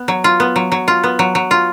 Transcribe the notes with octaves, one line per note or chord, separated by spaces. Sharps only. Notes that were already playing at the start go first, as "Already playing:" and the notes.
Already playing: B3
F#3
F4
B3
F#3
F#3
F4
B3
F#3
F#3
F4